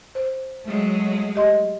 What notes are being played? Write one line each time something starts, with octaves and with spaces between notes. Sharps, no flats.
C5
F#3 G#3 A3
G4 D#5 C6